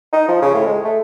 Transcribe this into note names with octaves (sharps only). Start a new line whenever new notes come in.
D#4
F3
C#3
A2
G#3
A3